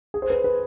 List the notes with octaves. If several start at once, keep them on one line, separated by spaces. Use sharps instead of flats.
G#4
C5
B4
B4